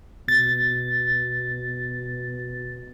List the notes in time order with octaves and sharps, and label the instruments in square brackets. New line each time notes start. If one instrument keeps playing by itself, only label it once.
[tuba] B2 [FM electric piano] A6